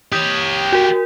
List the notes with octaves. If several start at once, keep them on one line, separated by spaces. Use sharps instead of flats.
G4 C#5 D#6 G6
F#4 A#4